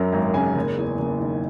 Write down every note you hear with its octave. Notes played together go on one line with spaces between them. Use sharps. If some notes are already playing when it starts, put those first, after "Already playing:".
Already playing: F#2 F#3 A#5
G#1 A#5
C#3 G#5
F#1
E2
F#1
D#3